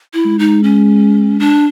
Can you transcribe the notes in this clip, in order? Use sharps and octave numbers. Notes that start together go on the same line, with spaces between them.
E4
G#3
D#4
C#4
D4